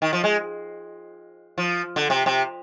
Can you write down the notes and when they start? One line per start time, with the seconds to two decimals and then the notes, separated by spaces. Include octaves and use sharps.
0.02 D#3
0.13 F3
0.24 G#3
1.58 F3
1.96 D3
2.10 C3
2.26 C3